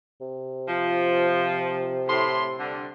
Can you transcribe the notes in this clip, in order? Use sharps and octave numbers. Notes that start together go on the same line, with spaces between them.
C3
F3
A2 C6
D3 G3